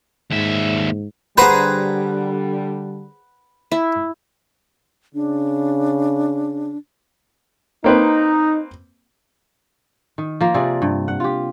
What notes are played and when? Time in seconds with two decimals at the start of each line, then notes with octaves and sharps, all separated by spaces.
0.31 D#2 G#2 E5
1.38 D3 G3 G#4 B4 C5 F#5 A#5
3.72 E4
5.14 C#3 D4
7.84 A#3 C4 D#4 B4
10.18 D#3
10.41 F3 A#3
10.54 C3 G#4 D5
10.82 G2
11.08 F#5
11.20 F4 G4